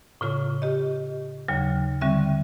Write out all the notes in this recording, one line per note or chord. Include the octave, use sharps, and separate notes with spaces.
A2 C#3 F4
G4 D#5
D#2 C#3 F#3
D3 G3 C4 E5 C#6